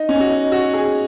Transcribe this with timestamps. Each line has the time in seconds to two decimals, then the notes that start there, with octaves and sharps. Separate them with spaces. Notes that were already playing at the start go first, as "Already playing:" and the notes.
Already playing: D#4
0.09 C#4
0.20 F#4
0.30 D#4
0.52 F#4
0.73 G#4